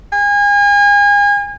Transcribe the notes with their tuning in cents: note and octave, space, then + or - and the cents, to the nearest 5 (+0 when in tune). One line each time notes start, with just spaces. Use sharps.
G#5 -35